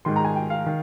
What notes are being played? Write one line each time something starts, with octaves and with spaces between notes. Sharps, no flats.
G#2 D#3 C6
A#5
G#5
G5
F5
D#3